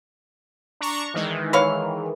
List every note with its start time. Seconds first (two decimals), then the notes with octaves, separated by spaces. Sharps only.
0.81 D4 A#5 C#6
1.14 D#3 E3 G#3
1.53 B4 C#5 F5